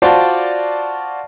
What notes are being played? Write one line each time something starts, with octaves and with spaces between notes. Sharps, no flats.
F4 F#4 C5 D5 A5